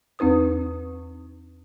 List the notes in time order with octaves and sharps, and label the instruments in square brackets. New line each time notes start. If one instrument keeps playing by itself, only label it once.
[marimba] E2 C4 D#4 B4 D#6